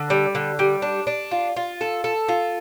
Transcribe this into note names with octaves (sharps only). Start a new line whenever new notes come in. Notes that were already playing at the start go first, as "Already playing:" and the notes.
Already playing: D3
G3
D3
G3
D4
D4
F4
F4
A4
A4
F4